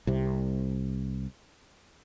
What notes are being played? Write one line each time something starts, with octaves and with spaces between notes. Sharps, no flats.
C2 C3